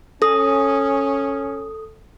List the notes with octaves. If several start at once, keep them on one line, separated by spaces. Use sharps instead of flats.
C#4 A4 D#6